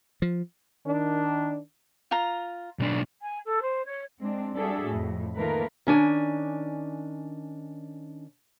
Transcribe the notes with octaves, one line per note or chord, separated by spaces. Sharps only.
F3
D#3 D4
F4 A#5
B1 D4
G#5
A4
C5
C#5
G#3 C4 D4
G3 D4 F#4 G#4 A4 E5
F2 A2
D#3 A3 A#3 F4 A#4 B4
D#3 C#4 D4 G#5